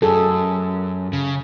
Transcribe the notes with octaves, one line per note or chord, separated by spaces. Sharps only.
F#2 G#4 A4
C#3